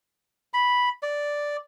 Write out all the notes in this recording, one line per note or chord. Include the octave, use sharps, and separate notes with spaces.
B5
D5